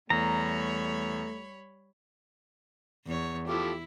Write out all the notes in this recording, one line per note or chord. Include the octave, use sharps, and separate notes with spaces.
E2 G3 A3 C#5 A#5 B5
E2 C#5
F3 A3 E4 G4